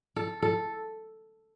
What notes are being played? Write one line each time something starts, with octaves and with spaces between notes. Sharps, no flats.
A4
A4